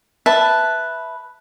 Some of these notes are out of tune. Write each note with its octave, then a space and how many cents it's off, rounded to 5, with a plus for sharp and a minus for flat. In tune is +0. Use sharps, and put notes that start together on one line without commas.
B4 +0 E5 +0 A5 +0